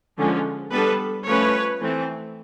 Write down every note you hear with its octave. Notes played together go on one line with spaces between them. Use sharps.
D3 F3 G#3 C#4
G3 B3 D4 A4 B4
F3 A3 C#4 B4 C#5
E3 A3 C4